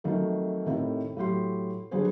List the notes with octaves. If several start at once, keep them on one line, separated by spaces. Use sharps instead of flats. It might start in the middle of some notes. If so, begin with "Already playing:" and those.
F2 C3 D#3 F#3 A3
A2 C3 D#3
A2 F#3 G4 C6
D3 F#3 G3 G#4 B4 C5